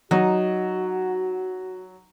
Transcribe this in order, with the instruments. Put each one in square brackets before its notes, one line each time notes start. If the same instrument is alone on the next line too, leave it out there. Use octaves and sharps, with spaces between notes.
[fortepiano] F#3 [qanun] D#4 [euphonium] F#4